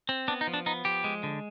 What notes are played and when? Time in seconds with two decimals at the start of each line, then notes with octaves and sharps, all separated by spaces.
0.09 C4
0.28 B3 D4
0.41 D#4
0.47 F3
0.54 D4
0.66 B3 D#4
0.85 F3 G4
1.04 G#3
1.23 D3